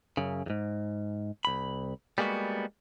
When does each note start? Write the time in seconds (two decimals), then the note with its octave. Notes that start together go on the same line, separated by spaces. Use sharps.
0.17 F#2 C#3
0.46 E2 G#2
1.45 C2 B5
2.18 G3 G#3 A#3 B3 F#4